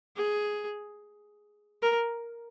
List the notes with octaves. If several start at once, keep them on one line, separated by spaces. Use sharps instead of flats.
G#4
A#4